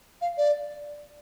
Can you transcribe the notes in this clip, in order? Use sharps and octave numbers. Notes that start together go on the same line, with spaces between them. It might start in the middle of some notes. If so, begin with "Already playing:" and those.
F5
D5